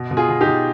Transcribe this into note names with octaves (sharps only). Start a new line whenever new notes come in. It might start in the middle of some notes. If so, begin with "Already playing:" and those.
Already playing: B2
B2
F4 G#4
B2
D#4 G4
B2